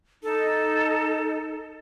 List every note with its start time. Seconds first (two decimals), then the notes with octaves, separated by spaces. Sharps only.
0.23 D#4 A4